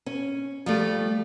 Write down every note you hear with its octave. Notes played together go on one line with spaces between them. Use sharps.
C#4
F3 G3 A3